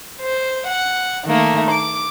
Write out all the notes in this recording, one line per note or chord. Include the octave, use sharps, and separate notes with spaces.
C5
F#5
D#3 A3 A#3
D6